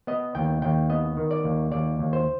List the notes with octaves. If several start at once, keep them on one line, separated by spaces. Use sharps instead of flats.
B3 D#5
D#2 G5
D#2 G5
B3 D#5
D#3
D5
D#2
D#2 D5
D#2
C5